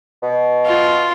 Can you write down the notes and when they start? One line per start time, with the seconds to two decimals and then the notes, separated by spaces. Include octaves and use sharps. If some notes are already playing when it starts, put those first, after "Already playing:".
0.22 B2
0.66 F4